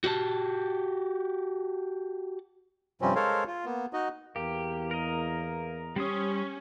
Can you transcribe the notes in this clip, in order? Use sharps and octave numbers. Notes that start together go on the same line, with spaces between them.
F#4 G4 D5 A5
G2 C3 F3 G3 C4 C#4
G#3 A4 A#4 C5 C#5 F5
F4
A#3 B3
D#4 F#4 D#5
E2 A#3 G4
A#4 D#5
G3 C#4 G4 C5 D#6